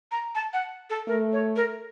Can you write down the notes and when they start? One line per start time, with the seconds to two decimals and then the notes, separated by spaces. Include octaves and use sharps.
0.11 A#5
0.35 A5
0.53 F#5
0.90 A4
1.07 A3 A#4
1.33 C#5
1.56 A#4